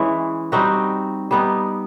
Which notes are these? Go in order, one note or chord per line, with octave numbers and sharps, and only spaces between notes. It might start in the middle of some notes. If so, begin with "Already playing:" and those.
Already playing: E3 G#3 C#4 E4
G3 C4 D#4 F#4
G3 B3 D#4